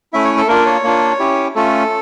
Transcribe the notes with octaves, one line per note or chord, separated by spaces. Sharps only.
A3 C#4 E4 E5
C#5
A4
A#3 D4 F4 A#4
C#5
A#3 D4 F4
C#4 E4 G4
A3 C#4 F4 A4